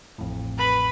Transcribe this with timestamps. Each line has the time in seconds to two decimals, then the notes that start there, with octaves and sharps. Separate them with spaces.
0.18 A1 F2 A2
0.58 B4 B5